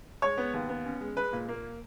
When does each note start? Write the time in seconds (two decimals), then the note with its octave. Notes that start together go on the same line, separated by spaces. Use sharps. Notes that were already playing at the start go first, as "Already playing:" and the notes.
0.22 G#3 C#5
0.38 B3
0.54 D#2
0.69 B3
0.85 C#4
1.01 G#3
1.16 G#3 B4
1.33 A#2
1.49 A#3